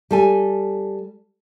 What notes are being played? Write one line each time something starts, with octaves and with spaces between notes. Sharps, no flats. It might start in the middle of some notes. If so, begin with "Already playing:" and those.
G3 A4 G#5